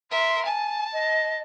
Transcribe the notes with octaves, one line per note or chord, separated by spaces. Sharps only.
A#4 E5 C6
G#5 A5
D#5